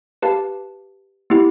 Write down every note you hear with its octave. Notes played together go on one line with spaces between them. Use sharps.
G4 B4 F5 A5
B3 E4 G4